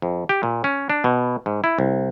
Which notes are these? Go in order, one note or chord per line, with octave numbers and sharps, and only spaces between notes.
F2
G4
A#2
C#4
D4
B2
G#2
E4
C2